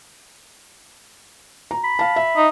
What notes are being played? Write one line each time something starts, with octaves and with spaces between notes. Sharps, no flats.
A#5
B5
F5 A5
E5
D#4